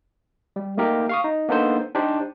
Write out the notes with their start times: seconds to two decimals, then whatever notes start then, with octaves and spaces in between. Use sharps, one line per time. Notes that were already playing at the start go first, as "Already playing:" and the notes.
0.56 G3
0.77 A3 A#3 D#4 G4 A#4
1.09 F5 C#6 D#6
1.24 D#4
1.49 A#3 B3 D4 D#4 A4 C5
1.95 D4 D#4 G4 C5